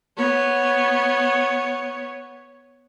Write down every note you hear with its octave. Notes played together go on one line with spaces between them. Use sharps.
B3 C#5